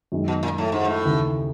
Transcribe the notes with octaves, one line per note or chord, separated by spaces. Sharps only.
F#2 D#3 G#3
B2
A#2
A2
G#2
A2
D#2 C#3 E3